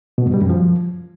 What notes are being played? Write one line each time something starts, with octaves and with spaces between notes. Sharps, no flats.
B2
G2
G3
F#2
F3